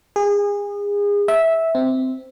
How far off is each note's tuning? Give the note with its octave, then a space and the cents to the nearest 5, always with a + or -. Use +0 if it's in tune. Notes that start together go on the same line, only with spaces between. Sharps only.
G#4 -30
E5 -10
C4 -10